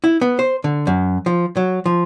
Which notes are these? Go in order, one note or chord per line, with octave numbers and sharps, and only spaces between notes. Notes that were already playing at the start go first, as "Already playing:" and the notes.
E4
B3
C5
D3
F#2
F3
F#3
F3